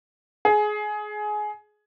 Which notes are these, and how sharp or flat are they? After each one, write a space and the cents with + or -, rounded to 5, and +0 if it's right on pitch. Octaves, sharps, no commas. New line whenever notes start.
G#4 +20